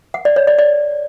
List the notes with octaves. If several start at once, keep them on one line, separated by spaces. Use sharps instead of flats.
F#5
D5
C#5
D5
D5